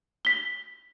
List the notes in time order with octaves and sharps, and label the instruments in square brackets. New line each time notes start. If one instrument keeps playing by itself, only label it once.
[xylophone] B6 G7